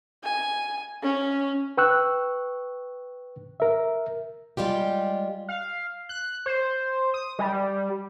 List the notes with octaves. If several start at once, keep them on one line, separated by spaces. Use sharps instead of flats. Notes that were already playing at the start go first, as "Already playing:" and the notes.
G#5
C#4
B4 G5 C#6 E6 F#6
A#4 E5
G3 G#3 F4 G4
F5
F#6
C5
D#6
G3